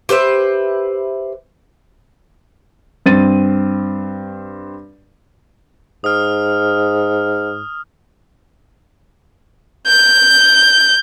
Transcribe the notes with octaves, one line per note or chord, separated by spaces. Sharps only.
G4 B4 C5 E5
G2 C4 A6 D#7
G#2 D#6 F6
G6